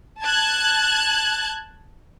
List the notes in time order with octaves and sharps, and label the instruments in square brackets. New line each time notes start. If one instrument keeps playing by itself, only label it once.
[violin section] A5 F#6 G#6